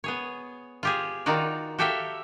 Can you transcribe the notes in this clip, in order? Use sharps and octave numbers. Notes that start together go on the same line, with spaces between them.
B3 G#4 C#5
F4 G4 G#4
D#3 D#4 F4 F#4 D5
F#4 G4 A4 E5 F5 G5